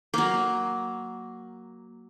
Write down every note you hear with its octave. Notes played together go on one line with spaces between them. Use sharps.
F#3 A#3